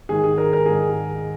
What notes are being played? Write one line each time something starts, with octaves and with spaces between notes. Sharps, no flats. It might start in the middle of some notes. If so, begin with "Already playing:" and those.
G#2 D#3 G#3 G#4
G#4
A#4
A#4
G#2 D#3 G#3 G#4
G#4